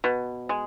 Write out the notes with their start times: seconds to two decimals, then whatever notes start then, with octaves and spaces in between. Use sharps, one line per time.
0.04 B2
0.49 G#3